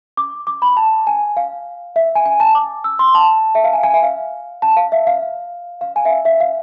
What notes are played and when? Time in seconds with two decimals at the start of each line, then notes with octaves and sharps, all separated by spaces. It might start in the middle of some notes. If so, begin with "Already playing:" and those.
0.17 D6
0.47 D6
0.62 B5
0.77 A5
1.07 G#5
1.37 F5
1.96 E5
2.15 G#5
2.26 G#5
2.40 A5
2.55 D6
2.84 E6
2.99 C6
3.15 A5
3.55 E5
3.64 F5
3.73 G#5
3.83 G#5
3.94 E5
4.03 F5
4.62 A5
4.77 F5
4.92 E5
5.07 F5
5.81 F5
5.96 G#5
6.05 E5
6.10 F5
6.25 E5
6.40 F5